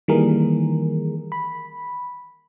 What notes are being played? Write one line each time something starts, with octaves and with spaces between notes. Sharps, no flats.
D#3 E3 G3 A#3 G#4 A#4
B5